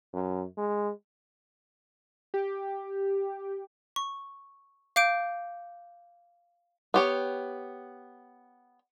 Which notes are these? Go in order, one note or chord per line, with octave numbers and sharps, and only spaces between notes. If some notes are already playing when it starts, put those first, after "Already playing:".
F#2
G#3
G4
C#6
F5 D6 G6 D7
B3 G4 C#5